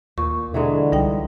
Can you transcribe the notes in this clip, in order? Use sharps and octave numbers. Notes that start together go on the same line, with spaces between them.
D#2 A#2 C#6
B2 D3 E3 F#3 G#3
C2 G3 D#4 G5